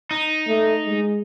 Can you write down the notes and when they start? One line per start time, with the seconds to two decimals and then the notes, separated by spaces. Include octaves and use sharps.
0.11 D#4
0.47 A3
0.86 G#3